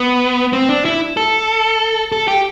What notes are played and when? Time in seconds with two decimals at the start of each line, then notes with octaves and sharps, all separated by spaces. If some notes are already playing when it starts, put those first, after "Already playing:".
Already playing: B3
0.53 C4
0.69 D4
0.85 E4
1.17 A4
2.12 A4
2.28 G4